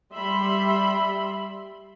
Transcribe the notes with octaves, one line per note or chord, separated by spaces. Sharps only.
G3 E5 B5 C6